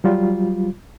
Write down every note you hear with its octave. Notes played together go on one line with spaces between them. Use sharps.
F#3 G3 F4